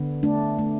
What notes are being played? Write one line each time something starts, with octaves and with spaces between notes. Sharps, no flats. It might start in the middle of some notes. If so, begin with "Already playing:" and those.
Already playing: D3 B3
A3 D4
A3